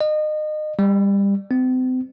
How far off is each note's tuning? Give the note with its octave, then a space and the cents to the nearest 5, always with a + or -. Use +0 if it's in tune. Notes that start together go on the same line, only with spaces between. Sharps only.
D#5 -30
G3 +25
C4 -40